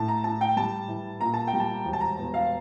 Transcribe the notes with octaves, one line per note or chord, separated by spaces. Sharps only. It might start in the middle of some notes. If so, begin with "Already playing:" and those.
Already playing: A2 A5
A#5
A2 A5
G5
G3 A5
E3
A#2 A#5
A5
G5
G3
A5
E1
A5
A#5
E2
F5